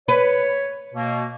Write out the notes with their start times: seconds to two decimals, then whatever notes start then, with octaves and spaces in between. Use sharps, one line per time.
0.08 B4 C#5
0.95 B2 A#3